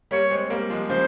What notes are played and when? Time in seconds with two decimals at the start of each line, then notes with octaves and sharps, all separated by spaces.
0.11 G3 A#3 C#5
0.30 G#3 C4
0.50 G3 A#3
0.70 F3 G#3
0.89 C#3 F3 C5